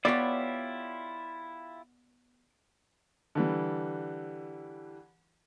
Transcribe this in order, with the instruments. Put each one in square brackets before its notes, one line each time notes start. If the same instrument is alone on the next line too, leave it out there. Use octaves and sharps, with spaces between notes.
[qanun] B3 C#5 [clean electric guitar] E4 F4 G4 [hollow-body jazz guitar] D5
[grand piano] D3 E3 G3